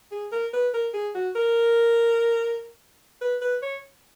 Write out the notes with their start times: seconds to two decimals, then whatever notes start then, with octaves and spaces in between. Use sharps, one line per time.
0.12 G#4
0.32 A#4
0.54 B4
0.74 A#4
0.94 G#4
1.14 F#4
1.35 A#4
3.21 B4
3.41 B4
3.62 C#5